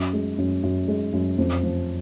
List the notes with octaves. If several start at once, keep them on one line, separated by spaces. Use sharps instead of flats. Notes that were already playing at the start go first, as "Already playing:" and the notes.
Already playing: F#2
G#3
F#2
F#2
G#3
F#2
F2
F3